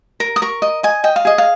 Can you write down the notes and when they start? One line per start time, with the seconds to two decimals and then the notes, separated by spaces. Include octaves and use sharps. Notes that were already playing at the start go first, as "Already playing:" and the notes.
0.20 A#4
0.36 D#6
0.42 A#4 C#6
0.62 D#5
0.83 D#5 G#5
1.04 D#5 G5
1.16 F5
1.25 G#4 D#5
1.38 F5